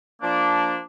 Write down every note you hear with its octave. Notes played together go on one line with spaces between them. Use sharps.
F3 A#3 D4